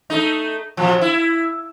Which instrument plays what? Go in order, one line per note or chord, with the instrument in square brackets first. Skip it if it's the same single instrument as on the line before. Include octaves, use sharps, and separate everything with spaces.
[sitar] A3 D#4
A#2 F3
E4